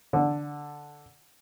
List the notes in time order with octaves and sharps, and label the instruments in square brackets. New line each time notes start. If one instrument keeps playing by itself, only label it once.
[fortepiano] D3